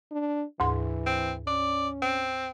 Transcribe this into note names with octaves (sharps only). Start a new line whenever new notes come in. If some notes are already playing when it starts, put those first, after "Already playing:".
D4
D2 G#2 E3 C6
C4
C#4 D5
C4